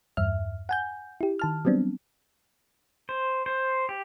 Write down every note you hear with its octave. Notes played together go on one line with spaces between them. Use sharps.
E2 G2 E5 F6
F#5 G#5 G6
E4 G4
D#3 A5 F6
F#3 G3 B3 C4 D4
C5
C5
G4